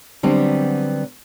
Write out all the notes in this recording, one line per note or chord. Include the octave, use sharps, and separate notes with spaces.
D3 F#3 G3 B3 C4